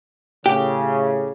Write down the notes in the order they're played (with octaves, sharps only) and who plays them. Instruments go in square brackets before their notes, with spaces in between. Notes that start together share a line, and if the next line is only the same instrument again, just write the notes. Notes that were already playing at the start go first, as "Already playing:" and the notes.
[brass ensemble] A2 C#3 [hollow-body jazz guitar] G4